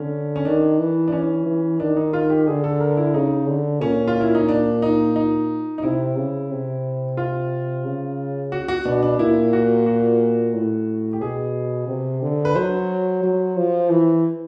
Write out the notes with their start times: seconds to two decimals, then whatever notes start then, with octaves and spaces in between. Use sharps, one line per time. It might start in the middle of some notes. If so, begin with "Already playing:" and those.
Already playing: D3 C#4
0.36 C#4
0.45 D#3 D4
0.79 E3
1.08 D4
1.12 E3 C#4
1.46 E3
1.80 D#3 D4
1.97 D#4
2.13 F4
2.30 G4
2.47 D3 G#4
2.64 A4
2.80 A#4
2.97 E4
3.14 C#3 D#4
3.47 D3
3.81 A#2 C#4
4.08 F4
4.21 E4
4.35 D#4
4.49 D4
4.82 D#4
5.16 D#4
5.78 D#4
5.83 C3 E4
6.16 C#3
6.51 C3
7.17 F4
7.85 C#3
8.52 F#4
8.68 F#4
8.85 B2 D4
9.03 D4
9.19 A#2 E4
9.53 F#4
9.86 F#4
10.54 A2
11.13 G4
11.21 B2 G#4
11.88 C3
12.22 D3
12.45 B4
12.55 F#3 C5
13.23 F#3
13.57 F3
13.89 E3